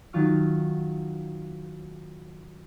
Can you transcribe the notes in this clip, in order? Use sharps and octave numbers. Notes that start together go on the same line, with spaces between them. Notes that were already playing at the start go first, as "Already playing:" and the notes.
D#3 F#3 F4 C#6 F6